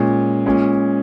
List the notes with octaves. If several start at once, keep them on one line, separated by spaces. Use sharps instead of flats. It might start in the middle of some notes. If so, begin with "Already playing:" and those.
Already playing: A#2 G#3 C#4
A#2 G#3 C#4